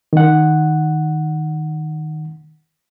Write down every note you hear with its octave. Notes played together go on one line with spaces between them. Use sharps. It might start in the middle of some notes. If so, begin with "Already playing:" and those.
D#3 F#5